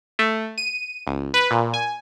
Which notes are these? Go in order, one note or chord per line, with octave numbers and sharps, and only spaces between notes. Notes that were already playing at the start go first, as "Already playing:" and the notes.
A3
D#7
C#2
B4
A#2
G#5